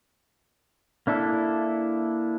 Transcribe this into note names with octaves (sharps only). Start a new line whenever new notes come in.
A#3 D4 E4 A4